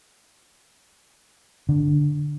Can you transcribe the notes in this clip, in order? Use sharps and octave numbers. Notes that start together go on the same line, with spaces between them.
D3